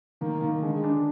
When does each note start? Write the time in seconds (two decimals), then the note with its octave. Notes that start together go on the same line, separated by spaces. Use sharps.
0.21 D#3 A#3
0.42 D#3
0.63 D3 G#3
0.84 D4